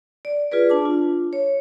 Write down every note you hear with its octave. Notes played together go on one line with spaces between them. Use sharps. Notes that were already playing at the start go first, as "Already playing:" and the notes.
D5
F4 G#4 B4 D5
D4 A5 D6
F4
C#5